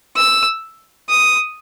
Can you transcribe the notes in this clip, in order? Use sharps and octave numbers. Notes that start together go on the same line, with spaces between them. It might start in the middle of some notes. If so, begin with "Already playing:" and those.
E6
D#6